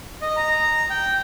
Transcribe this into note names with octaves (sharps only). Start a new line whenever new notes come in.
D#5
A#5
G5